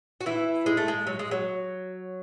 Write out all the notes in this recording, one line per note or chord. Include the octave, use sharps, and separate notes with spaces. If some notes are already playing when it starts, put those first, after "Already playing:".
F#4
E3 E4
G#3
A3
G#3
F#3
G#3
F#3